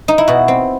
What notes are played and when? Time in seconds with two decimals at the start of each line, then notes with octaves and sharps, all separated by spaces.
0.08 D#4
0.18 E4
0.28 B2 F#4
0.48 C4